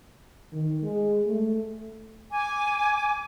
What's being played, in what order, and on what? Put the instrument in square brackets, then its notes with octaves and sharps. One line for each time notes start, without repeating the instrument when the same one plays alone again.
[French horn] D#3
G#3
A3
[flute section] G#5 D6